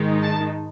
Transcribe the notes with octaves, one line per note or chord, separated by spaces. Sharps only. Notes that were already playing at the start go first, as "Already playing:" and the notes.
Already playing: G#2 D#3 G#3 D#4
A5